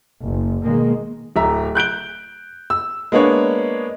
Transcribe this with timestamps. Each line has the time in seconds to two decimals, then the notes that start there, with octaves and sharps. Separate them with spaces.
0.24 F#1
0.63 B2 D#3 G#3 A#3
1.36 D1 E5 A#5
1.75 F#6 G6 D7 G7
2.70 E6
3.12 G#3 A#3 B3 D4 C#5